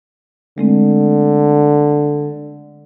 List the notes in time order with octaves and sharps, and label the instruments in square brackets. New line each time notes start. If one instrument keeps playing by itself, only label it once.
[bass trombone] D3 [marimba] G#3 A3 C4